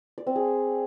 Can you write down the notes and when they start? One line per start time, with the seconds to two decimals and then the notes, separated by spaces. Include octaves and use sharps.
0.18 D5
0.27 C4
0.36 G#4